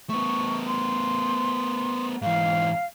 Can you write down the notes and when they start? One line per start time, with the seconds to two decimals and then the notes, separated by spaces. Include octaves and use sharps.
0.10 A3 B3 C#6
0.67 C6
2.22 G#2 E3 F5